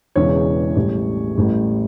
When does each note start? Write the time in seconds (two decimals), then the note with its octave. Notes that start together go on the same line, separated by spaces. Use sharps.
0.16 E1 E2 C#3 E3 C#5
0.76 A1 A2 G3
1.36 A1 A2 G3